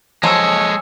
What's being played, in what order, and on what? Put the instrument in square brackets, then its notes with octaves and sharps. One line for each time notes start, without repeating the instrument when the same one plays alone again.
[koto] F3 F#3 [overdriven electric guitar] G#3 A4 [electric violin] C#5 [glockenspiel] G#5 E6